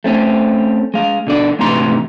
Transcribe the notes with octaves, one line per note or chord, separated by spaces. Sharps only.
A3 C4 C#4
G#3 F5
B2 D3 D5
D2 G#2 C3 E3 A#5 C6